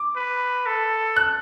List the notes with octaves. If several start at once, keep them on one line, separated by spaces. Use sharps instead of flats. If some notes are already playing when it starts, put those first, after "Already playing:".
Already playing: D6
B4
A4
F#6